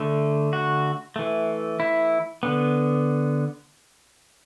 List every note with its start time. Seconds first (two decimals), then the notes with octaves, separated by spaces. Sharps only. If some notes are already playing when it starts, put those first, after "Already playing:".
Already playing: D3 A3
0.53 F#4
1.16 E3 A3
1.80 E4
2.43 D3 B3